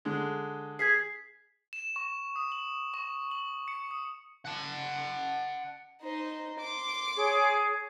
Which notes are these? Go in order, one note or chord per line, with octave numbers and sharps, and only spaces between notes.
D3 G#3
G#4 G#6 B6 C7
E7
C#6
D#6
F#7
C#6
F#7
C#7
D#6
F#5 A5
D#4 C5
C6 D6
G#4 C#5